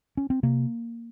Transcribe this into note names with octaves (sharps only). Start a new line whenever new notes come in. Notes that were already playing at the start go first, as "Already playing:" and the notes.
C#4
C4
C3 A#3